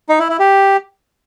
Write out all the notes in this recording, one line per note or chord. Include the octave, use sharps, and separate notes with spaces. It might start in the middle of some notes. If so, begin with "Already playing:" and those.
D#4
E4
E4
G4